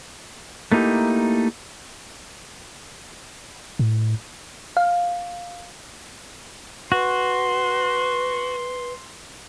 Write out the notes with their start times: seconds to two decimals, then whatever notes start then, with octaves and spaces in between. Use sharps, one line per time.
0.72 A3 A#3 D#4 E4 G4
3.79 A2
4.77 F5
6.92 F#4 B4 C6